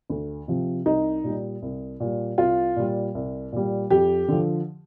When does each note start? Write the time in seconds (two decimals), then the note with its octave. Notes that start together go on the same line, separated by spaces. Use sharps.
0.10 D2
0.48 C3 F3
0.86 C2 D#4
1.24 A#2 G3
1.62 C2
2.00 A#2 G3
2.38 C2 F4
2.76 A#2 G3
3.15 C2
3.52 A#2 G3
3.90 F2 G4
4.28 D3 F3